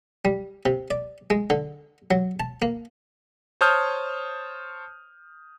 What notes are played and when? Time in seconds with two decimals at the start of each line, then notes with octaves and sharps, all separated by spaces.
0.25 G3
0.66 C3
0.91 D5
1.30 G#3
1.50 D3
2.11 F#3
2.40 A5
2.62 A#3
3.61 C5 C#5 A5 D#6 F6 G6